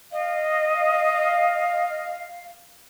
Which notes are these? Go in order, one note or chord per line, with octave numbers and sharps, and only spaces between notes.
D#5 F5